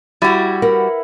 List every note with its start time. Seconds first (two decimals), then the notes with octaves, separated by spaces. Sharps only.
0.22 G3 E4 F#4
0.62 A#4 B4 F#5